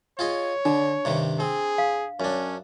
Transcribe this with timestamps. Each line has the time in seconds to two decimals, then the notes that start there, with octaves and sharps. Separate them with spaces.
0.19 F4 G#4 C#5 D#5
0.65 D3 D4
1.05 G2 C3 D#3
1.40 C4 G#4
1.78 F5
2.20 F#2 C#4 D4